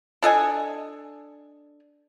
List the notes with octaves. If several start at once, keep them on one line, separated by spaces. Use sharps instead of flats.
D4 A4 D#5 G#5